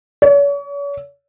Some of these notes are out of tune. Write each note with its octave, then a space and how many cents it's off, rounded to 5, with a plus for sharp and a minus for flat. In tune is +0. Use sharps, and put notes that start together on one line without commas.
C#5 +40